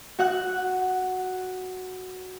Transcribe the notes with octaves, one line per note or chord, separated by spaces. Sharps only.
F#4 F#5 F#6